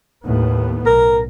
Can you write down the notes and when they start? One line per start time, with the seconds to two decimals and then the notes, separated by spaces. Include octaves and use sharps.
0.25 D#2 A2 B3
0.86 B1 A#4